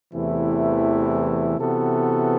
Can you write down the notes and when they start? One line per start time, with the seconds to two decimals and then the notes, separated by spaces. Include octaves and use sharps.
0.13 E2 C3 E3 A3 E4
1.59 C3 E3 B3 F#4 A4